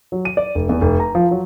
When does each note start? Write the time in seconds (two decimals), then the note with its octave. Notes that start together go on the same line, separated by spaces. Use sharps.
0.12 F#3
0.25 D#7
0.37 D5
0.55 F1
0.69 E2
0.81 F1
1.00 A#5
1.15 F3
1.31 F#3